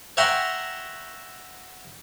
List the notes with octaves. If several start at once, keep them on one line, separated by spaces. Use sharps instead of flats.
C#5 E5 F#5 G5 A#5 C6